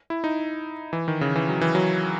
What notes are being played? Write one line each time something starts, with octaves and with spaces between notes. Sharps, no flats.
E4
D#4
E3
D#3
C#3
E3
F#3
E3
F#3